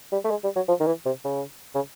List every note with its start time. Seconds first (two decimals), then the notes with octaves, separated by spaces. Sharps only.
0.12 G3
0.25 A3
0.31 G#3
0.44 G3
0.56 F#3
0.68 F3
0.80 D#3
0.86 E3
1.06 C3
1.25 C#3
1.75 C#3